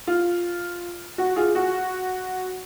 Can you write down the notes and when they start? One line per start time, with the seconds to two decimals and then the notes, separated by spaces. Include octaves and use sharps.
0.07 F4
1.18 F#4
1.36 F4 G#4
1.55 F#4